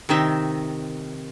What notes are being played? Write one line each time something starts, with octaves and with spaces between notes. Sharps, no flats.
C3 D#3 D#4 E5